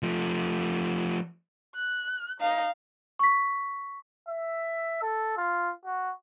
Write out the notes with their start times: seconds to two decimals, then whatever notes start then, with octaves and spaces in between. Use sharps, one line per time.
0.03 F3 A3
1.75 F#6
2.40 D#4 F5
3.19 C#6 B6
4.29 E5
5.02 A4
5.37 F4
5.85 F#4